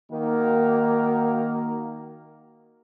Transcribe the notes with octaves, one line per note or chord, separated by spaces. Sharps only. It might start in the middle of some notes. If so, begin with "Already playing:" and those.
D#3 A#3 F#4 A#4